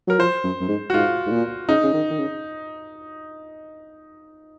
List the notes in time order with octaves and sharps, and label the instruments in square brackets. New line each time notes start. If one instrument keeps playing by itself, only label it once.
[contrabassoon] F#3 [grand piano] A#4
[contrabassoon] F3 [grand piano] C5
[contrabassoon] F#2
F#2
G#2
[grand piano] F#4
[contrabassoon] G#2 [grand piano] F4
[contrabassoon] G#2
A#2
[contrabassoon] C#3 [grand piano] D#4
[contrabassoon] C#3
D#3
D#3
C#3